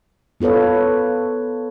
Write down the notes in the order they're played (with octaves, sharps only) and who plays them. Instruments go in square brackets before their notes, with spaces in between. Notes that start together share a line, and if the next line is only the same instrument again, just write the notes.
[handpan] B3 F4 A4 B4 C#5